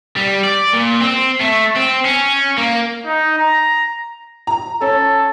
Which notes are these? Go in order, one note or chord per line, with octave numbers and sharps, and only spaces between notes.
G3
D5
A#2
C4
A3
C4
C#4
A#3
D#4
A#5
A#5
C#4 A4